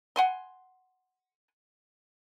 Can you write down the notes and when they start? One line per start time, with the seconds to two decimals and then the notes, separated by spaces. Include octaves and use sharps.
0.16 F#5 G#5 C6